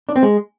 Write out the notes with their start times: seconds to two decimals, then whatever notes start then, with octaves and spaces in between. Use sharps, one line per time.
0.09 D4
0.16 C4
0.23 G#3